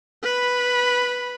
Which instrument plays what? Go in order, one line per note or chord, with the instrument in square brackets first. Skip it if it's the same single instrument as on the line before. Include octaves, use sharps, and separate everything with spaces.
[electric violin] B4 B5